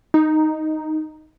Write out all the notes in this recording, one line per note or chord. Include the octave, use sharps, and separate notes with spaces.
D#4